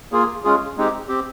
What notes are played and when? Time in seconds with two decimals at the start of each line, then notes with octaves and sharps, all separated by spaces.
0.12 A#3 F4 G#4
0.44 G#3 C#4 F4 G#4
0.77 G#3 C4 D#4 G4
1.09 C4 G4